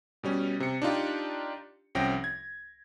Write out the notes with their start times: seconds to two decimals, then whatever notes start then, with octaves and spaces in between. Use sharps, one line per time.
0.23 B2 G3 C#4
0.60 C3 C#7
0.82 D4 D#4 F4 G4
1.95 C2 F3 C#4 G5 A#6
2.24 G#6